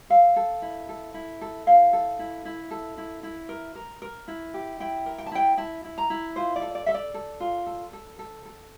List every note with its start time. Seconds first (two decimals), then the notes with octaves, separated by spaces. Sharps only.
0.10 A4 F5
0.36 A4
0.62 E4
0.89 A4
1.14 E4
1.41 A4
1.66 E4 F5
1.93 A4
2.19 E4
2.45 E4
2.71 A4
2.98 E4
3.23 E4
3.49 A#4
3.75 A#4
4.02 A#4
4.28 E4
4.54 G4
4.80 E4 G5
5.06 A#4
5.18 G5
5.26 A5
5.32 E4 G5
5.57 E4 A5
5.84 E4
5.98 A#5
6.10 E4
6.36 F4 C5
6.56 D5
6.62 A4
6.75 D5
6.86 A4 E5
6.94 D5
7.14 A4
7.40 F4
7.66 A4
7.93 A4
8.19 A4
8.45 A4